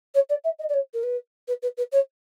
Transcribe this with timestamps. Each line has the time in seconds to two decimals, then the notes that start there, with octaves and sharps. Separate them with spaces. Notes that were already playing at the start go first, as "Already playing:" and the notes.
0.15 C#5
0.30 D5
0.44 E5
0.59 D#5
0.69 D5
0.74 C#5
0.94 A#4
1.03 B4
1.48 B4
1.63 B4
1.77 B4
1.92 C#5